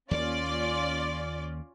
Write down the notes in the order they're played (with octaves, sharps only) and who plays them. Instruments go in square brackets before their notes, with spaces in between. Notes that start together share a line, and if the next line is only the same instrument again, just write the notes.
[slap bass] D#2 A#3 [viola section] C#4 F4 [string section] D5